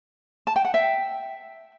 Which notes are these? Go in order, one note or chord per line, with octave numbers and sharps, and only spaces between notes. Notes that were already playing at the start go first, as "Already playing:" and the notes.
A5
G5
F#5
E5 G5